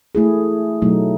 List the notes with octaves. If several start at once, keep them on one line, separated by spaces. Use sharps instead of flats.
A3 E4 G#4
B2 F#3 A3 D#4